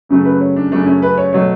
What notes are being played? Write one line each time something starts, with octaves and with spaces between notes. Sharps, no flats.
F#2 C#3 F#3 A3
B4
C#5
D4
F#2 C#3 F#3 A3 D4
C#4
B4
C#5
B2 F#3 A3 C#5